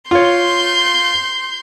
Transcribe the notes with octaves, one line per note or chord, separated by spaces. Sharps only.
F4 C#5 C6 G6